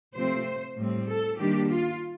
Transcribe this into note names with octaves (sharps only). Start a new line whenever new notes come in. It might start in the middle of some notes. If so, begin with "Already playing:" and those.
C3 F3 A3 C4 C5
A2 G3 C4
A4
D#3 G3 A#3 D4 G4
F4